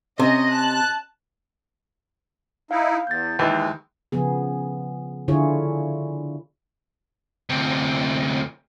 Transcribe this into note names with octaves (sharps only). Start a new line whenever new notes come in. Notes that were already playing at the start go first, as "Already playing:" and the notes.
C3 C#4 D#5
A5 F#6
D#4 E4 F5
E2 G6 A6
D#2 E3 G#3
C#3 F3 B3 G#4
D3 E4 F4 G#4 C#5
D2 C3